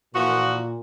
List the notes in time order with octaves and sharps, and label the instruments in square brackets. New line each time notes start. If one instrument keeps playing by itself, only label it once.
[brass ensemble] A#2 [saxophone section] E3 F3 F#4